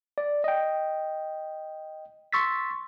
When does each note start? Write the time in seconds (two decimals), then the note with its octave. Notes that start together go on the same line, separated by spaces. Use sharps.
0.18 D5
0.44 D#5 G5
2.33 C6 C#6 E6 A6 B6